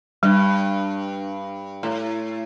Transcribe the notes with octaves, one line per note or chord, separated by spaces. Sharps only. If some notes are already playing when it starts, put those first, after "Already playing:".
G2 G3
A2